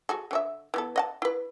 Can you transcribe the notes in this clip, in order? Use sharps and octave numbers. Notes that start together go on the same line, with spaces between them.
F#4 G#4 A4
D3 C#4 E5
E3 B3 A4
D#5 F#5 A5
E4 B4